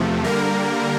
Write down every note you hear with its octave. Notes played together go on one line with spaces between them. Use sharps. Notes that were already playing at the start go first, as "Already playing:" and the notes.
Already playing: E2 C3 F3 A3
D3 G3 A#3 A#4